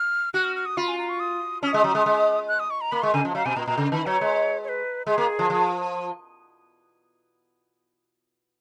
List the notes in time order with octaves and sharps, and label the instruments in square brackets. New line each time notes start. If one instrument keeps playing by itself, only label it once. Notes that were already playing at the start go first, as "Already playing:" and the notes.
Already playing: [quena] F6
[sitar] F#4 [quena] F#6
[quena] F6
F6
D#6
[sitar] F4 [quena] B5
[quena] G#5
A#5
C#6
D#6
[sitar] C#4 [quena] F6
[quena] D#6
[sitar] G#3
F#3
G#3
G#3
[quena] F#6
D#6
C#6
A#5
[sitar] A#3 [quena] B5
[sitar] G#3 [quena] C#6
[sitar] C#3 [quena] G#5
[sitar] F3
[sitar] F#3 [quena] F5
[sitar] B2 [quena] G#5
[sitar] A#2 [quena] A#5
[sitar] A#2 [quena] A#5
[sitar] C#3
[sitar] D#3 [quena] B5
[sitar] F#3 [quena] C#5
[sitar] G#3
[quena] C#5
B4
[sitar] G#3 [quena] G#4
[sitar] A#3
F3
F3